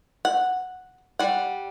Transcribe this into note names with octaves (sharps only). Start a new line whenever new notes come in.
F#5
G3 F#5